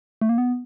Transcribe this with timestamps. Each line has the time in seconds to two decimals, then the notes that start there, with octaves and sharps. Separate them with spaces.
0.21 A3
0.29 A#3
0.38 B3